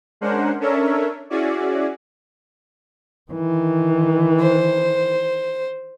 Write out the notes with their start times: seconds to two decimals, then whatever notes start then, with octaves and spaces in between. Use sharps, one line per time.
0.21 G#3 C#4 D4 A#4 C5 F#5
0.61 C#4 D4 A4 A#4 C#5 E5
1.30 C#4 E4 F#4 G#4 D5
3.31 D#3 E3
4.41 C5